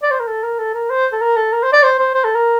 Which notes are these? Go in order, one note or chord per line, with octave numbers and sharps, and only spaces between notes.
D5
C5
A#4
A4
A#4
A4
A#4
C5
A4
A#4
A4
A#4
C5
D5
C5
C5
C5
A4
A#4